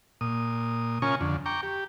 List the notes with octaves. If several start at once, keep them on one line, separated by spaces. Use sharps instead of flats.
A#2 D#6
C#3 C#4 F4 A#4 G#5 C#6
F2 D3
G5 A#5 C#6 D6
G4